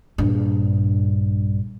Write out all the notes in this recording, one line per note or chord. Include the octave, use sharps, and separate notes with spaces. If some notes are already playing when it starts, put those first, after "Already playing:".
A#1 G2